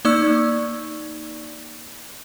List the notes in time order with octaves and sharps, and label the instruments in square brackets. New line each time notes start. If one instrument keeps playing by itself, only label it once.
[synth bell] A#3 D#4 D5 C#6 E6